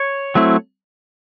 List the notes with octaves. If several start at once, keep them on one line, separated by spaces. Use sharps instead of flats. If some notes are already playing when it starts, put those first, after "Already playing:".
Already playing: C#5
F#3 A3 C4 E4